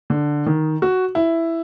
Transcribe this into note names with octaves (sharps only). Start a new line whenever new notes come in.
D3
D#3
F#4
E4